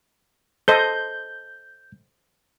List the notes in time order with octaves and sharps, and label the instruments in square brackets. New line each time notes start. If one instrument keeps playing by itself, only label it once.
[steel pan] A4 C5 D#5 [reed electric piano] G6